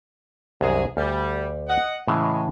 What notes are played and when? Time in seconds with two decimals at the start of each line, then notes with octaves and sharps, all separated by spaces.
0.61 C2 F#2 D#3 G#3 G#4
0.97 D2 G3
1.68 D#5 F#5
2.07 A2 C#3 E3 G#3